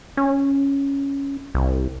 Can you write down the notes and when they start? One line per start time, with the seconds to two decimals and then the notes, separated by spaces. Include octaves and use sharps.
0.17 C#4
1.55 C2